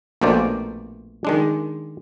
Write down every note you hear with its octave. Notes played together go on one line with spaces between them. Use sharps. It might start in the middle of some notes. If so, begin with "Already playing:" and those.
A#1 B2 A3 A#3 C5 D5
D#3 G#3 D4